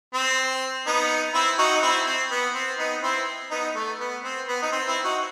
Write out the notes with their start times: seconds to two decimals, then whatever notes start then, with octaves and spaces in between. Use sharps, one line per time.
0.14 C4
0.86 B3 D#4
1.34 C4 E4
1.58 D#4 F#4
1.75 D#4
1.82 C4 E4
2.06 C4
2.30 B3
2.55 C4
2.79 B3 D#4
3.03 C4 E4
3.51 B3 D#4
3.75 A3
4.00 B3
4.24 C4
4.48 B3
4.62 D#4
4.72 C4
4.88 C4 E4
5.04 D#4 F#4